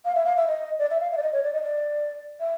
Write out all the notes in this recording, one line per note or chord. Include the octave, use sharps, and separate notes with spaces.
F5
E5
F5
E5
D#5
D5
E5
F5
E5
D5
D#5
C#5
D5
D#5
D5
E5